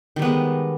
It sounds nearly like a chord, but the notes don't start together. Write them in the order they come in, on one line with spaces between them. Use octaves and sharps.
D#3 G3 B3 G#3